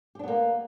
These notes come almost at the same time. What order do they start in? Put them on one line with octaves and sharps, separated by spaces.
G4 D4 B3 A#3